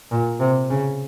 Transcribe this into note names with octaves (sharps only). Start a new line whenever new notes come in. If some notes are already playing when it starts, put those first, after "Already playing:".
A#2
C3
C#3